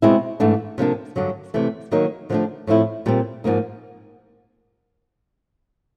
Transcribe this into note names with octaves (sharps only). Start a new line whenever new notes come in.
B2 G#3 C4 E4
G#2 E3 A3 D4
C3 F3 A#3 D4
G2 D3 F#3
C3 E3 A3
D#3 F#3 A#3 D#4
D3 F3 A3 D4
A2 F3 A3 C4 E4
A#2 G3 C4
G#2 F3 A#3 D#4